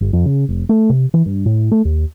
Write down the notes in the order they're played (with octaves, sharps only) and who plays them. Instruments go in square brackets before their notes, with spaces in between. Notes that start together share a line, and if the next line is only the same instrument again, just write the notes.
[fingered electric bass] G1
F2
C#3
F1
A3
C3
E3
G2
A2
A3
D#2